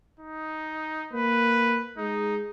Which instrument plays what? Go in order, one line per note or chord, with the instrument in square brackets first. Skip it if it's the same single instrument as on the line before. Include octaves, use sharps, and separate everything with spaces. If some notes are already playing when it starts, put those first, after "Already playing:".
[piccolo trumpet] D#4
[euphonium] A#3 [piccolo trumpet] B4
[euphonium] G#3 [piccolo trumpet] D#4